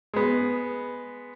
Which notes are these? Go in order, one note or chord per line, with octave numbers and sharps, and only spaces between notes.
G#3 B3